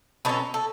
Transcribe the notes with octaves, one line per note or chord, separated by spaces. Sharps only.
B2 F#3 C#4 E4 A4
A4